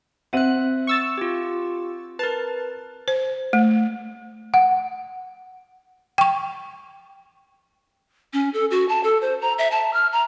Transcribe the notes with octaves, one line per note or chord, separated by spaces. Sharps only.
C4 E5 F#5 F#6 D#7
C#6 E6 A6
F4 G4
A#4 B4 A5
C5
A3
F#5
G5 C#6
C#4
A4
F#4
A5
A4
C5
A#5
E5
A5
F6
A#5